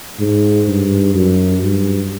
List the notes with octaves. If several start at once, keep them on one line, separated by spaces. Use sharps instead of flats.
G#2
G2
F#2
G2